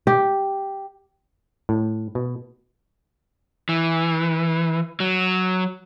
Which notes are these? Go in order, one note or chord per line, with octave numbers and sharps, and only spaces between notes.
G4
A2
B2
E3
F#3